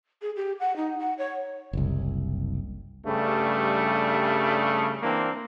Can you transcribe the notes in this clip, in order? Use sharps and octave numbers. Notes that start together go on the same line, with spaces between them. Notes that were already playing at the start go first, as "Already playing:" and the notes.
G#4
G4
F#5
D#4
F#5
C#5
F#1 C2
G2 C#3 G3 A3
E3 A#3 C4 D4